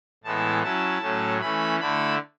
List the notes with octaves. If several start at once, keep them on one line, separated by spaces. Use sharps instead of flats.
A2 E3 G#3 B3 E4 A5
F#3 C#4 E4 A5
A2 F#3 A3 C#4
E3 A3 C#4 B5
D3 A3 E4 B5